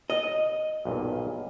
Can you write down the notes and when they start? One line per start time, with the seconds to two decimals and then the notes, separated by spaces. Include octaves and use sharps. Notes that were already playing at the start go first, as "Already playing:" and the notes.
0.10 D#5
0.85 B1 G2 A#2